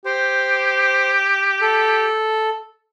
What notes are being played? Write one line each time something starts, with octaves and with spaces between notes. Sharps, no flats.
G4 C5
A4